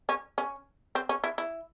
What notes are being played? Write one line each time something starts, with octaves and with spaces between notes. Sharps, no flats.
C#4
C#4
C4
C#4
E4
E4